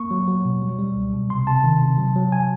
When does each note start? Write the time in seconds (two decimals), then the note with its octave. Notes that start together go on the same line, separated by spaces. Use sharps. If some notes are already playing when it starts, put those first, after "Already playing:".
Already playing: A#3 C#6
0.11 F#3
0.28 F#3
0.45 B2
0.62 G3
0.79 G3
0.96 C#2
1.13 B2
1.30 C3 C6
1.47 C3 A5
1.64 D#3
1.81 C3
1.98 F#3
2.16 F#3
2.32 G#5